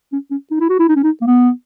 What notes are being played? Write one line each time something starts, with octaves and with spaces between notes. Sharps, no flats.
C#4
C#4
D#4
E4
F#4
E4
D#4
C#4
D#4
A#3
B3